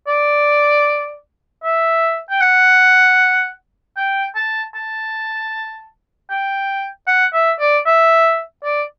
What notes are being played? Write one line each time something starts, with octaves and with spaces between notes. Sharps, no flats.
D5
E5
G5
F#5
G5
A5
A5
G5
F#5
E5
D5
E5
D5